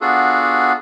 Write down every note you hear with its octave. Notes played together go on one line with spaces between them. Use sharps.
B3 D4 F4 F#4 G#4 A4